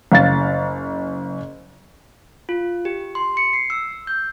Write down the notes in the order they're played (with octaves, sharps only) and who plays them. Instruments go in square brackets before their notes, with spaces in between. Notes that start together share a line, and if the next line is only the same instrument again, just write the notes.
[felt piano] F#1 F5 A6
[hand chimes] F4
G4
C6
C#7
C7
E6
G6